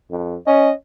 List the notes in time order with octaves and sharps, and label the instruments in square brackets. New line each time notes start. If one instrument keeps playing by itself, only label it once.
[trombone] F2
[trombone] C#4 [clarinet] D#5